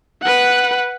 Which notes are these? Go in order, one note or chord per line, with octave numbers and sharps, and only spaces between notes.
B4 F#5